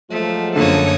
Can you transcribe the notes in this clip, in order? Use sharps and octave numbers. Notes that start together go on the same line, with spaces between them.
F3 F#3 G#3 A3
F#2 D3 A#3 A4 C#5 D#6